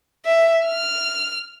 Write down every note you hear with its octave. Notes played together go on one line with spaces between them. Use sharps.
E5
F6